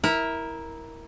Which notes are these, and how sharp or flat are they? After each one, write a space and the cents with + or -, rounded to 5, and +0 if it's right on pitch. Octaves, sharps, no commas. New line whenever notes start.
E4 -15 A#4 +5